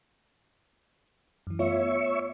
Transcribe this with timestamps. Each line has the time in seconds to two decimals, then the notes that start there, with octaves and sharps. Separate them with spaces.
1.47 F#2 E3
1.59 A3 B3 F4 C#5 E5 C#6